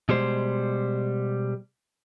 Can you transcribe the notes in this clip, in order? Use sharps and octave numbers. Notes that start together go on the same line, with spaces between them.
B2 G3 G#3 C5